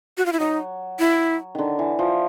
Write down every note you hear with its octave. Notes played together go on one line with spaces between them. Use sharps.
F#4
F4
E4
F#3 D#4
E4
D3 D#3
E3
F3